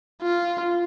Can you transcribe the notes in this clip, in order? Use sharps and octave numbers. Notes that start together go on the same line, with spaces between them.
F4